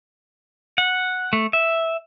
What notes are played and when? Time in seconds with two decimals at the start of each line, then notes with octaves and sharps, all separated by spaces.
0.78 F#5
1.33 A3
1.53 E5